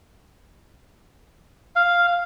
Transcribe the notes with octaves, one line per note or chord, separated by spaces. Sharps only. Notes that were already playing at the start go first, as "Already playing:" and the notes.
F5